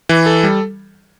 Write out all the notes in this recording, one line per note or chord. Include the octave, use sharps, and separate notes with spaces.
E3
A4
G3